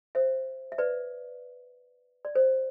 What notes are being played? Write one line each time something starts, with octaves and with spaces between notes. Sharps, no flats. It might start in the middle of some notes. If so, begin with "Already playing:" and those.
C5 E5
E5
B4 D5
D5
C5